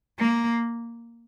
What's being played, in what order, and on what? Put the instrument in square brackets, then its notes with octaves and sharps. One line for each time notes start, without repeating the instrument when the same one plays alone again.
[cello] A#3